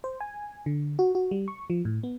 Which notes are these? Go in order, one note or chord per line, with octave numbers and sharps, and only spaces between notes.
C5
G#5
D3
F#4
F#4
G3
C#6
F3
A2
B3